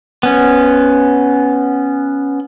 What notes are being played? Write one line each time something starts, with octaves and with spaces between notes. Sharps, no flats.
B3 C#4